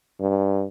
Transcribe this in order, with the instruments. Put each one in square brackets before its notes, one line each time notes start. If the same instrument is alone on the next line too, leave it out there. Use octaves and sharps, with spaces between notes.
[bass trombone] G2